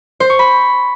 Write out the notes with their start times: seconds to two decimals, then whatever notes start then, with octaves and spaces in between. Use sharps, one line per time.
0.20 C5
0.30 C#6
0.39 B5